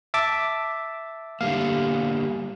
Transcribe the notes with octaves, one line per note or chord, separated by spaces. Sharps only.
E5 A5 D6
D3 G3 A#3 F5